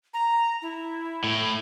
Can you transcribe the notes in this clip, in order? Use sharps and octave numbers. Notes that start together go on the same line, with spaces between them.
A#5
E4
A2